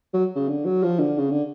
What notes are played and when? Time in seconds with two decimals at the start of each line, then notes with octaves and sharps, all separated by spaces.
0.14 F#3
0.36 C#3
0.48 D3
0.65 F#3
0.83 F3
0.99 D3
1.18 C#3
1.30 D3